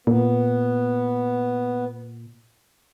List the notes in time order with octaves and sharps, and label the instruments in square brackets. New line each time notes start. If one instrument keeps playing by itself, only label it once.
[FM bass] A#2 [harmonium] B3